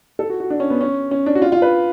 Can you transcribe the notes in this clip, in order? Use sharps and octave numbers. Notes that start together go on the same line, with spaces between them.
A4
F#4
F#4
D4
C#4
B3
C#4
C#4
D4
F#4
F4
F4
B4